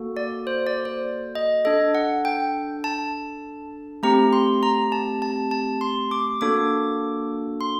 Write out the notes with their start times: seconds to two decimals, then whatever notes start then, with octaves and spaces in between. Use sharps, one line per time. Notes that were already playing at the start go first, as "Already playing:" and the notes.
Already playing: A#3 F#4 A4
0.17 D5
0.47 C5
0.67 D5
0.85 C5
1.35 D#5
1.65 D4 A4 D#5
1.95 F#5
2.25 G5
2.84 A5
4.03 A3 C4 G4 A#5
4.33 C6
4.63 A#5
4.92 A5
5.22 A5
5.51 A5
5.81 C6
6.11 D6
6.41 A#3 D4 F#4 A4 D6
7.61 C6